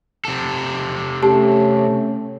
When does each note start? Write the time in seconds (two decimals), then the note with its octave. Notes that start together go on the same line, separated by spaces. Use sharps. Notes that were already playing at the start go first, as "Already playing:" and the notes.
0.25 C3 A4
1.23 A3 C#4 G4 A5